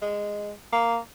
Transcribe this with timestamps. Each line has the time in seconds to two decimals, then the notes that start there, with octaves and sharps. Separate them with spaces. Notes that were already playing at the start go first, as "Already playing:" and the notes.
0.02 G#3
0.72 A#3